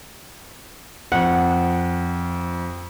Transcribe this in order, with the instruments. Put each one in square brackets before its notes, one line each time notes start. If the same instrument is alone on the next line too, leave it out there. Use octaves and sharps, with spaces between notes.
[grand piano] F2 [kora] F#5